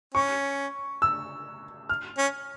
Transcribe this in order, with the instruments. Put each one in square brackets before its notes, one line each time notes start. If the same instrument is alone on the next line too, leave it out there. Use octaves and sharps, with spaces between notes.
[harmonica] C#4 [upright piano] C#6
[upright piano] E6
F6
[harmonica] C#4